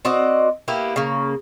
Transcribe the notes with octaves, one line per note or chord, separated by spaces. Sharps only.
C4 F#4 D5 D#5
A#3 B3 E4 G4
C#3 A#3